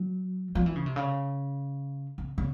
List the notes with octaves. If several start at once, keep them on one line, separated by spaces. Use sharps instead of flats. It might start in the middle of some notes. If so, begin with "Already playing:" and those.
Already playing: F#3
F3
E3
C#3
C3
C#3
C#3
C#3